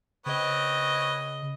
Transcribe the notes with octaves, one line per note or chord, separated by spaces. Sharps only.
C#3 C4 B4 C#5 D#5